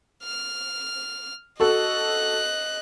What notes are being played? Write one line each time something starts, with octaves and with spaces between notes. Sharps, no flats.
F6
F#4 A4 D#5 F#6